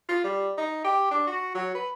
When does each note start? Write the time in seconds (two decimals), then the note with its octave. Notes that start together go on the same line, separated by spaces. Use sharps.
0.09 F4
0.24 G3
0.58 D#4
0.84 G4
1.11 D4
1.27 F#4
1.55 F#3
1.75 B4